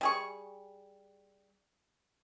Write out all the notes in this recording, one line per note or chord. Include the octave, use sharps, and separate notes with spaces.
G3 G#4 C#6